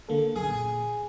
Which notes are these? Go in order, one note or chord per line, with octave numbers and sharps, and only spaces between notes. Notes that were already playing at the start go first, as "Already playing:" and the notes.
D3 A#3 A4
B1 F#2 G#4
A#2